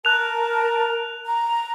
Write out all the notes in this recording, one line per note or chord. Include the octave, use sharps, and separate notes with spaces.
A#4 A5 F#6 F7
A#5